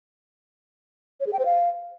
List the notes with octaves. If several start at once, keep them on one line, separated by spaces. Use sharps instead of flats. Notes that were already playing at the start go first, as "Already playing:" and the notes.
C#5
G#4
G5
C5
F5